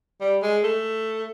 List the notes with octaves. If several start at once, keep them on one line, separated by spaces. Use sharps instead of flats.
G3
G#3
A3